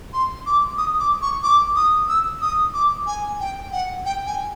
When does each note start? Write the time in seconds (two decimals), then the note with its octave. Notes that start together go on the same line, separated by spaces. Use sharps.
0.14 C6
0.46 D6
0.78 D#6
0.99 D6
1.22 C#6
1.43 D6
1.76 D#6
2.09 E6
2.41 D#6
2.74 D6
3.07 G#5
3.40 G5
3.72 F#5
4.05 G5
4.27 G#5